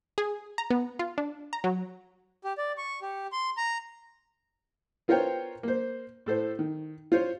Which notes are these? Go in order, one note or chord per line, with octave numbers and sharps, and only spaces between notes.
G#4
A#5
B3
F4
D4
A#5
F#3
G4
D5
C#6
G4
C6
A#5
B3 F4 A#4 C5 C#5 G5
A#3 C5
A2 A4 C5
D#3
F4 C5 C#5